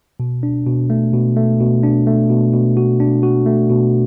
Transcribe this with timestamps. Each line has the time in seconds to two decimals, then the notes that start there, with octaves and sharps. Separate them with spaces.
0.20 B2
0.43 D4
0.66 B2
0.90 A3
1.13 B2
1.37 A3
1.60 B2
1.83 D4
2.07 A3
2.30 B2
2.53 B2
2.77 F#4
3.00 D4
3.23 F#4
3.46 A3
3.69 B2